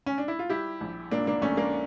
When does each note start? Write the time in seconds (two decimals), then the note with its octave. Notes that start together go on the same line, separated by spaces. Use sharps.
0.06 C#4
0.18 D4
0.28 E4
0.39 F4
0.50 G3 E4 G4
0.81 A#1
1.11 A#2 A#3 D4
1.27 A#3 D4
1.42 A#1 A3 C#4
1.57 A#3 D4